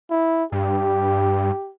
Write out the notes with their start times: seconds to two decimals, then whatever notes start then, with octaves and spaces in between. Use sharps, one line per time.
0.10 E4
0.52 G2 G4